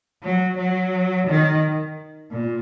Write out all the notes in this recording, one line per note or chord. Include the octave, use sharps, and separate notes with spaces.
F#3
F#3
D#3
A#2